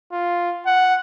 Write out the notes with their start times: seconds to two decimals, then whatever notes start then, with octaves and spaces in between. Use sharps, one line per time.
0.12 F4
0.66 F#5